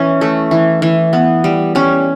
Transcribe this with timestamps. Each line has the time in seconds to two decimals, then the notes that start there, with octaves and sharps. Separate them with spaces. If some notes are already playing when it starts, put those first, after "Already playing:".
Already playing: E3 C#4
0.21 A3
0.51 E3
0.82 E3
1.13 B3
1.44 G3
1.75 G3 C#4